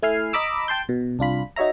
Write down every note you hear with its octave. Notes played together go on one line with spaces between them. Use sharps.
A3 E4 G#5 F6 C7
D#5 A#5 B5 D6 E6
G5 A5 C6 G6
B2
C2 D4 F4 B5
D#4 F#4 C#5 E5 A#5